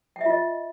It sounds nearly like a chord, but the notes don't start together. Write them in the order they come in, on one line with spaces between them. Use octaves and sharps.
G5 E5 F4 D#5